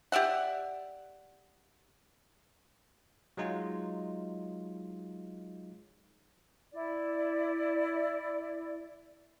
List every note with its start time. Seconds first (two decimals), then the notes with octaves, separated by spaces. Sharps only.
0.12 G4 D5 E5 F#5
3.37 F#3 G#3 D#4 F4
6.73 E4 D5